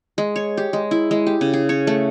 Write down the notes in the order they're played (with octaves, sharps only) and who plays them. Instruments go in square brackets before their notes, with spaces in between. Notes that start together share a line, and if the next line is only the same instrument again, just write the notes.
[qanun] G#3
C#5
G4
G#3
E4
G#3
G4
C#3
G#4
C#5
A3